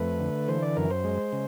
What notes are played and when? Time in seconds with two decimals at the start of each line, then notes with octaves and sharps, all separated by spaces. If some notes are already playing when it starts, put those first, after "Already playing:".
Already playing: F2 A3 B4
0.20 D3
0.48 E3 C5
0.62 D5
0.77 F#2 A#4
0.91 C5
1.04 G#3
1.32 C#3